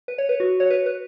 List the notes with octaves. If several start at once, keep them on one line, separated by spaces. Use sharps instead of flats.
B4
C#5
B4
F#4
C#5
B4
B4